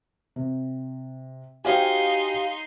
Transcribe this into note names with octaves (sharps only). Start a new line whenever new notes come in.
C3
D#4 F#4 G4 C5 F5 G5 G#5 C6